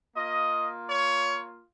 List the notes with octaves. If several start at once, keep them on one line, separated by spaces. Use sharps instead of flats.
A#3 F4 D#5
C#5